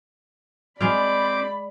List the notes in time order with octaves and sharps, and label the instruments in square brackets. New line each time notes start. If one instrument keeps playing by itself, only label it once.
[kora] G#3 F5 [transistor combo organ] C4 D6 [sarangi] D5 [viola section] B5